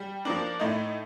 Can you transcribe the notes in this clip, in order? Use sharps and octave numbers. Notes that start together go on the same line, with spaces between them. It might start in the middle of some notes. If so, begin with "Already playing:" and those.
Already playing: G3
F3 A#3 D4
A2 A3 D#4